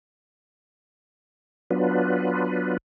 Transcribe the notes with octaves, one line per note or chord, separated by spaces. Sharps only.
F#3 B3 D4 F4 B4